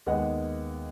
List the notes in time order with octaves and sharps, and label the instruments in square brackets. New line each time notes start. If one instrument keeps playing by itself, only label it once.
[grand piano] D#2 G#3 B3 D#5 F#5